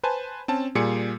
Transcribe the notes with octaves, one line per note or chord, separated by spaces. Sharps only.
B4 C5 G#5 A5
C4 C#4 A5
A#2 G3 G#4 C#7